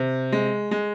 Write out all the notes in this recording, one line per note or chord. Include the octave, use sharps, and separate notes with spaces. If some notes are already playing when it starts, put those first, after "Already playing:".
Already playing: C3
G#3
G#3